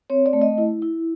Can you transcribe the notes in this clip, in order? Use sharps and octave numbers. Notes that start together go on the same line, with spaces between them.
C4 C#5
D5
A3
D#5
E4
E4